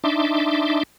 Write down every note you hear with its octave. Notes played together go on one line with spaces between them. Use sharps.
D4 D#4 E5 C6 D6